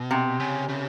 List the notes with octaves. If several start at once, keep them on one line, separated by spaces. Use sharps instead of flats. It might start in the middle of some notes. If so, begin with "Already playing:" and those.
Already playing: B2
C3
C#3
C#3